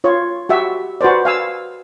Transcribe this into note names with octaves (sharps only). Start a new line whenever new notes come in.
F4 C#5
F#4 G4 E5
F#4 B4 C5 D5
F5 G#5 E6